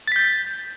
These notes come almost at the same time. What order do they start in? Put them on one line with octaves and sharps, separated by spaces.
A6 B6 G6